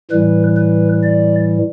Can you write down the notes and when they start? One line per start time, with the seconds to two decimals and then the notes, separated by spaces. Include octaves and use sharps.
0.11 A2 E3 G3 B4
0.57 B4
1.03 D5